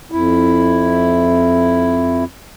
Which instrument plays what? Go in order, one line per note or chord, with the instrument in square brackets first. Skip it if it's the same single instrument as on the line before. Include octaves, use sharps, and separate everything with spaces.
[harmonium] F2 E4